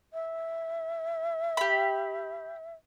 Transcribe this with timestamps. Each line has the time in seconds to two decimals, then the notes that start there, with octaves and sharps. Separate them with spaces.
0.13 E5
1.57 G4 B5